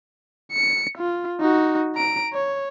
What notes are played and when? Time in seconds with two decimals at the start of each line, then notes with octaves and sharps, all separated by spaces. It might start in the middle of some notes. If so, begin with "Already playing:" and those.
0.52 C#7
0.98 F4
1.40 D#4 F#4
1.96 A#5 D7
2.33 C#5